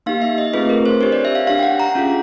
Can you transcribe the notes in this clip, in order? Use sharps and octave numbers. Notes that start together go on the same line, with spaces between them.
A#3 D#4 G4 F5
E5
D#5
A3 C4 F4 G#4 B4
A#4
C5
D4 G4 C#5
D5
E5
F5
D4 G4 F5
G5
F#5
A#5
C#4 F4 G#4